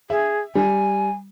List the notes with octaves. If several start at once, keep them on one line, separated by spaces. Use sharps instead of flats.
G#4 E5
G3 G#5